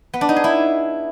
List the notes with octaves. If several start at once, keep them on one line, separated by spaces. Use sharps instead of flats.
B3
D4
D#4
G#4
E4